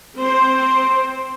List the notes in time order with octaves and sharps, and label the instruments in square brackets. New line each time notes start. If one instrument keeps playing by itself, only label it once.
[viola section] C4 C5